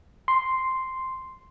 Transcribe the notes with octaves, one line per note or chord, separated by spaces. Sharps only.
C6